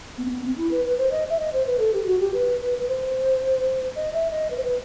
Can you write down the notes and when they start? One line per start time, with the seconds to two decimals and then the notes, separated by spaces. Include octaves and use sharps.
0.18 B3
0.25 C4
0.30 B3
0.45 C4
0.58 E4
0.71 B4
0.85 B4
0.98 C5
1.12 D#5
1.30 E5
1.40 D#5
1.53 C5
1.66 B4
1.79 A4
1.94 G4
2.06 F#4
2.20 G4
2.34 B4
2.61 B4
2.78 B4
2.88 C5
3.96 D#5
4.13 E5
4.31 D#5
4.51 B4
4.57 C5
4.64 B4